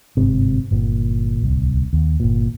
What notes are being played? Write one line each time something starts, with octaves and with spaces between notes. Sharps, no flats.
G1 G#2 C3
G1 A#2
D1 C2
D#2
G1 A#2